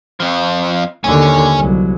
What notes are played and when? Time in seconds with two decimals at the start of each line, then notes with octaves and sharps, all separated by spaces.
0.20 F2 F3
1.04 D#2 D3 C#5 G#5
1.58 C2 F#3